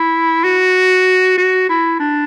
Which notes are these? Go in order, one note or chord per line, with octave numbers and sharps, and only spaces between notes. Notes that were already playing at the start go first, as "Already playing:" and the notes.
Already playing: E4
F#4
F#4
E4
D4